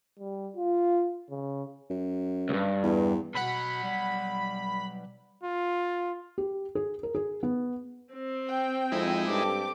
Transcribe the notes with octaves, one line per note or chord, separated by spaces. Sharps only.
G3
F4
C#3
F#2
C#2 G2
E2
B1 B2 F#5 B5
G3
F4
G4
G#4
A#4
G#4
B3
C4
G5
F2 G#3 D#4 E4
G2 C4 G4 A4 D6